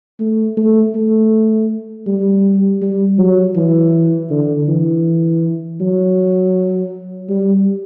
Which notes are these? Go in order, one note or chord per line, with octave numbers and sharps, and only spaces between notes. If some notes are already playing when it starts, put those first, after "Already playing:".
A3
A3
A3
G3
G3
F#3
E3
D3
E3
F#3
G3